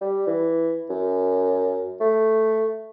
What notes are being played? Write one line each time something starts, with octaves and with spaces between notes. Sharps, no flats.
G3
E3
F#2
A3